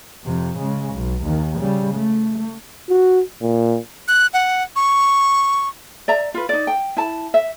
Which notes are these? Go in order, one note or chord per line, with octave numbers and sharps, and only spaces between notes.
F2 C3
C#3 G#3
B1
D#2 D#3
C#3 G3
A3
F#4
A#2
F#6
F#5
C#6
D5 E5 A#5
F4 B4
D#4 D5
G5
E4 A5
E5